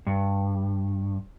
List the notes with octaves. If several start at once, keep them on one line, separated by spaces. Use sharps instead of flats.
G2